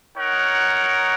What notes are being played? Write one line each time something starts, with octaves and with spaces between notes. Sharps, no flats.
D#4 A#4 C#5 F#5